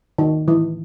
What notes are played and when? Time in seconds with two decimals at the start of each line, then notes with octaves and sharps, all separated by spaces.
0.18 D#3
0.48 E3